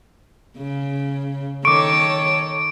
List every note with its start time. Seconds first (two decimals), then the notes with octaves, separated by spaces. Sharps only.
0.58 C#3
1.65 D#3 A4 C#5 C#6 D6 D7